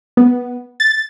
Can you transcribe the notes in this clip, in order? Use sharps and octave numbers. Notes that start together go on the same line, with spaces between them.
B3
A6